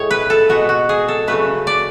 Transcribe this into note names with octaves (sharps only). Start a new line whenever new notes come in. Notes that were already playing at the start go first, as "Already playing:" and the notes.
Already playing: A2 G#3 C#5
B4
A4
B2 G#3 F#4
F#4
G#4
A4
C#3 F#3 A3 B4
D5